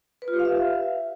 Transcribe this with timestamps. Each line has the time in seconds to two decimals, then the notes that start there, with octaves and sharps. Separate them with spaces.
0.22 B4
0.28 F4
0.34 G4
0.39 F5
0.45 E5